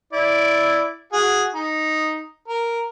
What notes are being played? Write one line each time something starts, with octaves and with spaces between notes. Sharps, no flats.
E4 D5
F#4 G#4
D#4
A#4